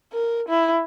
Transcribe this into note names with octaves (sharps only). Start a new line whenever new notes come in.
A#4
E4